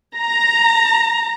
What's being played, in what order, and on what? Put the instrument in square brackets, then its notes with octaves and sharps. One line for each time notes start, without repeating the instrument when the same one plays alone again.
[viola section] A#5